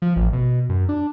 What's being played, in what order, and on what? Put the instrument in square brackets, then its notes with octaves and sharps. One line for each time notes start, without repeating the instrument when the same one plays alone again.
[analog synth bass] F3
A1
B2
F#2
D4